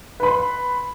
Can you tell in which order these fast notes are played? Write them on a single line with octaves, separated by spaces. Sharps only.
B4 B5 C6